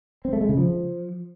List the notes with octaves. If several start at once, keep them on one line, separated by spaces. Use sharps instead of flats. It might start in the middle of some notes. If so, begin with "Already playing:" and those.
C4
A3
G#3
C#3
F3